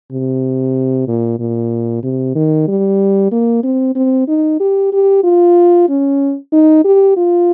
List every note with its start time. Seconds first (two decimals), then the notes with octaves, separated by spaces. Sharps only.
0.12 C3
1.08 A#2
1.39 A#2
2.03 C3
2.35 D#3
2.68 G3
3.32 A#3
3.63 C4
3.95 C4
4.28 D#4
4.60 G4
4.93 G4
5.24 F4
5.89 C#4
6.53 D#4
6.84 G4
7.17 F4